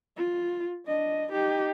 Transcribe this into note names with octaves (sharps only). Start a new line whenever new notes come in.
F4
D4 D#5
D#4 G4